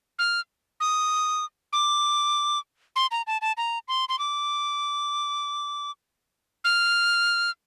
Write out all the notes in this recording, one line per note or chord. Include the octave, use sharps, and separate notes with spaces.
F6
D#6
D6
C6
A#5
A5
A5
A#5
C6
C6
D6
F6